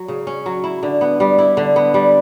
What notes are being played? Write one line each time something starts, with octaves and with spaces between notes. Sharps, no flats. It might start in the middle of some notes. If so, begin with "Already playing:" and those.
Already playing: F#3
C#3
C#4
F#3
E4
D3
B3
G3
E4
D3
B3
G3